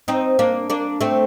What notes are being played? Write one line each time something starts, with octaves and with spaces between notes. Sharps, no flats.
C4 D#4
A#3 D4
A#3 D4
A3 C4